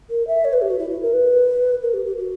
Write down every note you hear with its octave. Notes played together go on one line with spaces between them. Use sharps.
A#4
E5
C#5
B4
G4
F#4
E4
E4
A#4
B4
A#4
G4
G4
F#4